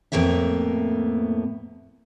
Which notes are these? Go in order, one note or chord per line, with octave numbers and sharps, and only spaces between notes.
F2 A2 A#3 B3 E5